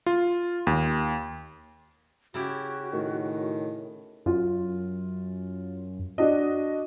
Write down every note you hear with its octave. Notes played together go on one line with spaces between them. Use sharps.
F4
D#2
C#3 E4 F#4 G4
A2 D#3
F#2 F4
D4 F#4 D#5